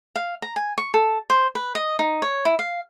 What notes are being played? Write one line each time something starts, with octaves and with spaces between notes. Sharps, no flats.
F5
A#5
G#5
C#6
A4
C5
B4
D#5
D#4
C#5
E4
F5